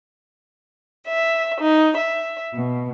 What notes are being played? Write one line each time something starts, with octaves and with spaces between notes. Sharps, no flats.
E5
D#4
E5
B2